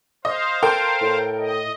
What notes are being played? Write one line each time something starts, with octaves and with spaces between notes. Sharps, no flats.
C5 D#5 F5
A4 A#4 G5
A2
D#5